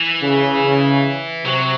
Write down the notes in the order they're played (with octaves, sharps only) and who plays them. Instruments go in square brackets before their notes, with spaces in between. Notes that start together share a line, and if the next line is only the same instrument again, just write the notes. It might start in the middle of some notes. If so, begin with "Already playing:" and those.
Already playing: [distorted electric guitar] E3
[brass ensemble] C#3
[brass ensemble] C3 [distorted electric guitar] F#3